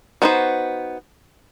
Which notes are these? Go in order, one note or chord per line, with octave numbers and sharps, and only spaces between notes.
G3 B3 D#4 F#4 C5